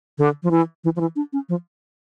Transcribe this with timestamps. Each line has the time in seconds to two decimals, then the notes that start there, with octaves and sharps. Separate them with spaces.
0.18 D3
0.43 F3
0.51 E3
0.84 E3
0.96 F3
1.01 E3
1.16 D4
1.33 C#4
1.49 F3